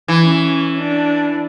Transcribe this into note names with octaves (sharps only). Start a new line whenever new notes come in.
E3
C#4
D4